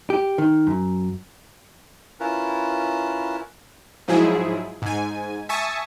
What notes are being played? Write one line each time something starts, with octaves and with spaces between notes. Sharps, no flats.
G4
D#3
F#2
C#4 E4 F4 A#4 B4
G#2 F3 F#3 E4 G#4
G#2 G#5
E5 G#5 A5 C#6 D#6